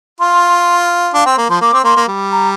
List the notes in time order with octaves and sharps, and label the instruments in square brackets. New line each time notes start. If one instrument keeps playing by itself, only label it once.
[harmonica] F4 [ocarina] C6
[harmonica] D4 [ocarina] F5
[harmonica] C4 [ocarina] G5
[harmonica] A#3
[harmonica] F3 [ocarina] C6
[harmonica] A#3 [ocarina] D6
[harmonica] C4
[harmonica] A#3 [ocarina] C6
[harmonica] A#3
G3
[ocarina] A#5